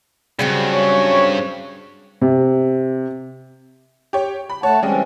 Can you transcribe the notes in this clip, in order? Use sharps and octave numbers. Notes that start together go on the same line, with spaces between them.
G2 C#3 F#3 C4
C#5
C3
G4 C#5
B5
A3 C#5 F#5 A5
E3 G3 G#3 C4 C#4